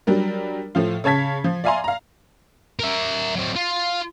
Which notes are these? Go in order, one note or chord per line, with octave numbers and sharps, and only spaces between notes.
F#3 G3 D4 A#4
A2 F3 F4
C#3 C#5 A5 G#6 B6
F3
D5 E5 F5 G#5 A#5 C6
F5 A#5
A#4 E5
F#3 C4
F4